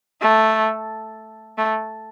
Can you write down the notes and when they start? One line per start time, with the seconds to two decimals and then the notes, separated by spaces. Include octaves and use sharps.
0.21 A3
1.58 A3